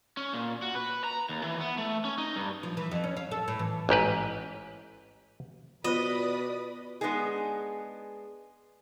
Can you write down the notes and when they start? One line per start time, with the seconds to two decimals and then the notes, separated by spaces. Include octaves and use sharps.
0.17 C#4
0.33 A#2
0.62 F#4
0.75 B4
1.04 A#5
1.29 D#2
1.44 E3
1.60 B3
1.78 A3
2.05 C#4
2.18 D#4
2.36 G2
2.63 F3
2.77 E3
2.91 F2
3.04 C#4
3.17 F5
3.31 A4
3.48 A2
3.59 E3
3.89 A1 G#2 G4 B4
5.84 B2 F4 B4 C5 D5 D#5 D#6
7.01 G#3 B3 D4 D#4 G#4